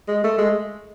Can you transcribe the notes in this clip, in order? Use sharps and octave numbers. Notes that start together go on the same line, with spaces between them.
G#3
A3
G#3